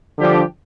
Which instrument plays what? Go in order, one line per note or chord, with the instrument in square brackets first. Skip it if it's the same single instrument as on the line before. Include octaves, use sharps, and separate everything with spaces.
[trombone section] D3 F3 [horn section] G3 D4 G4